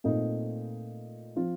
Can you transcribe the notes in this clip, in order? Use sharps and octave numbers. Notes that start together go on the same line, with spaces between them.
A#2 A3 C4 D#4
F3 C4 F4